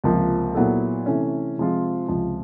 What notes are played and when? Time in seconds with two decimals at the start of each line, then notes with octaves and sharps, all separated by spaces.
0.04 C#2 C3 F3 A#3
0.55 A#2 F#3 B3 E4 A4
1.06 C3 E3 A3 C#4
1.58 C3 F3 G#3 C4 F4
2.08 C#2 C3 F3